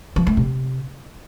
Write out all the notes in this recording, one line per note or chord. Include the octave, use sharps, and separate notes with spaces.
F3
A3
C3